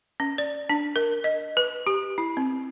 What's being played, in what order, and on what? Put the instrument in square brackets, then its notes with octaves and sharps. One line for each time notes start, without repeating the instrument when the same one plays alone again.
[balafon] C#4
D5
D4
A#4
D#5
B4
G4
E4
C4